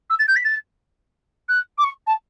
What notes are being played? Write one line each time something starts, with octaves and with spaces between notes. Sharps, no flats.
E6
A6
G6
B6
A6
F#6
D6
C#6
A5